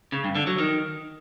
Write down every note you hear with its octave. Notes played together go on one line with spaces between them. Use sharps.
C#3
G2
D3
F#3
D#3